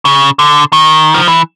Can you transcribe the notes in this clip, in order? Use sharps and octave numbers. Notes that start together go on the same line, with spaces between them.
C#3
D3
D#3
F3
E3